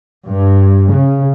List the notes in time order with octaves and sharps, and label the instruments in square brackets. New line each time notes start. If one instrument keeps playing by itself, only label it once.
[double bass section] G2
C#3